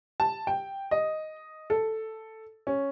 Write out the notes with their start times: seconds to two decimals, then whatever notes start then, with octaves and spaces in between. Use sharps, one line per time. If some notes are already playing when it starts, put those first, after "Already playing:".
0.20 A5
0.47 G5
0.91 D#5
1.70 A4
2.67 C#4